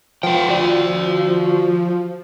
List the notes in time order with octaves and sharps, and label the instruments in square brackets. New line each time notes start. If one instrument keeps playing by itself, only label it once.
[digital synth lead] F3 [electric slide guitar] B4 F#5 G5
[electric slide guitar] F#4 D5